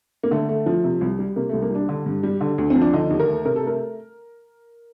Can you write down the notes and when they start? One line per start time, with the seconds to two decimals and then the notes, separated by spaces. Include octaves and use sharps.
0.23 A#3
0.31 D3 A3
0.49 A3
0.66 F3
0.84 C3
1.01 C2
1.19 G3
1.36 C3 A#3
1.49 C2 A3
1.62 A#3
1.71 G3 D4
1.89 D3
2.06 G2
2.23 G3
2.41 D3
2.58 D2
2.70 F3 C4
2.82 D4
2.93 D3 D#4
3.10 D#2
3.20 A#4
3.28 A3
3.45 C3 A#4
3.56 A4
3.63 A3 A#4